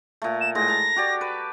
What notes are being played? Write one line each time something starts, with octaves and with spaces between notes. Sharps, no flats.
A#2 A3
E7
A2 G#3 A#6
A5 A#5
F#4 G4 D5
B4